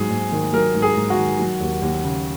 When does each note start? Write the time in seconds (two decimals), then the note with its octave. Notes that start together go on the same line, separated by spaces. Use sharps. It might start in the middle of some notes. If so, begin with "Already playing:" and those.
Already playing: G#2 F#3 G#4
0.10 G#2
0.32 D#3
0.53 F#3 A#4
0.75 G#2
0.82 G#4
0.96 G#2
1.10 F#4
1.18 D#3
1.39 F#3
1.61 D#2
1.82 D#2
2.04 C#3